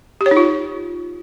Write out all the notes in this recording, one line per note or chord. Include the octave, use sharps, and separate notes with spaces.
G4
C#5
D#4
F4